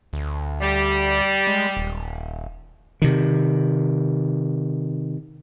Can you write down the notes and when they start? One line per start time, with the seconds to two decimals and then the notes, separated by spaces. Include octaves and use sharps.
0.13 D2
0.61 G3
1.47 G#3
1.77 D#1
3.02 C3 D#3